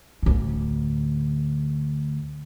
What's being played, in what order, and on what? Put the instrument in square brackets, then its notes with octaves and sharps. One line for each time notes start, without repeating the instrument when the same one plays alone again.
[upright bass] D2 A2